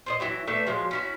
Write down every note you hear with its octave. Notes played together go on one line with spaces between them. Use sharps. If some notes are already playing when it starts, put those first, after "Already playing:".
C5 D5 D#5
E3 F#3 E4
A3 D4 B4 E5
F3 F#3 G#3
C#4 E4 F#4